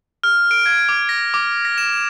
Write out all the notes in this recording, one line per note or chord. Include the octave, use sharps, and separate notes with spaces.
F6
D7
G#6
D6
A#6
D6
A#6
E7